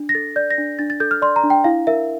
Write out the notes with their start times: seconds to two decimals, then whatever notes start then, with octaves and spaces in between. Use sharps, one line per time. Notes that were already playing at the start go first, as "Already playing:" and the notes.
Already playing: D4
0.09 A#6
0.15 A4 A6
0.36 D5 G6
0.51 A#6
0.58 D4
0.79 D4 A6
0.90 A6
1.00 A4 G6
1.11 F6
1.22 D5 C6
1.36 A#5
1.44 D4
1.50 G5
1.64 E4 F5
1.87 A#4 E5